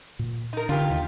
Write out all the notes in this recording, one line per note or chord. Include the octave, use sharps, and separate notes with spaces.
A#2
D#4 A#4
D3 D4 F4 G4
D#2 D#3